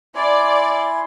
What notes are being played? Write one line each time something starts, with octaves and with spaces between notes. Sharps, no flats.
E4 D5 G#5 C6